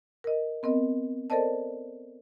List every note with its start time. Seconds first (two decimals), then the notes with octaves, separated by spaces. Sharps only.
0.24 A#4 D#5
0.63 B3 C4 A#4 D#5
1.30 A4 A#4 C5 D5 D#5 A5